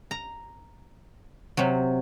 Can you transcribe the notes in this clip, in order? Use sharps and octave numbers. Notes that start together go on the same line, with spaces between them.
A#5
C3 F#3